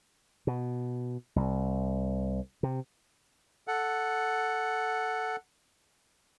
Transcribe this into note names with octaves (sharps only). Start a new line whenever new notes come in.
B2
C2
C3
A4 F#5